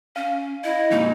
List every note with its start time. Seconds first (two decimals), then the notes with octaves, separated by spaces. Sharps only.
0.16 C#4 F5
0.64 E4 D#5
0.91 F2 A#2 D#4